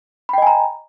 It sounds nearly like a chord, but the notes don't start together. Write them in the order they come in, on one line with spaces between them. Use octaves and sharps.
B5 G5 D#5 G#5 A#5